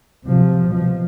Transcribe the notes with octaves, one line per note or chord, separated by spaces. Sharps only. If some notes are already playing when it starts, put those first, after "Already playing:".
C3 F3
B2 F3